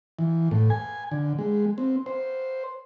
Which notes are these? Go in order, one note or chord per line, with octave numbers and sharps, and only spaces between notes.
E3
A2
G#5
D3
G#3
C4
C5